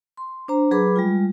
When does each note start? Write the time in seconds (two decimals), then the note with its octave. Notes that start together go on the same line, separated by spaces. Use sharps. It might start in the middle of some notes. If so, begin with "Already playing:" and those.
0.17 C6
0.48 D4 C5 A#5
0.71 F#3 G#4 B4 B5 D6
0.96 G3 G#3 F4